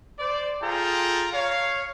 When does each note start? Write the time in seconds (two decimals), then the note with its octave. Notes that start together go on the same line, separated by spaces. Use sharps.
0.19 C5 D5
0.62 F4 G#4 A4 G5 A#5
1.33 C#5 F5